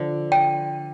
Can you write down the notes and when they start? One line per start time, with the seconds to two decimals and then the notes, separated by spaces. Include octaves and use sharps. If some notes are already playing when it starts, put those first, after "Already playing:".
Already playing: D3 F3
0.32 G5